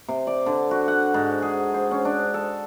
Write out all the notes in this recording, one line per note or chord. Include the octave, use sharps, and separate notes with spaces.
C3
D5
D3
F#4
F#5
G#2
G#4
C5
C#4
D4
A4